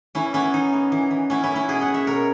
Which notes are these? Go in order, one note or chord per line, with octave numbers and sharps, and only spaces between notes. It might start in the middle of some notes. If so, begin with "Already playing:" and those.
E3 C#4 E4
B3 C#4 E4
E3 D#4
B3
E3
E3
B3 C#4 E4
C#4 E4
B3
C#4 E4
B2 E4 G#4
D#5 F#5
B2
C#5 E5
B2 A#4 C#5